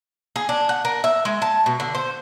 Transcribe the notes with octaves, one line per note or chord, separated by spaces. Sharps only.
G#4
D4
F#5
A#4
E5
G#3
A5
B2
D3
C5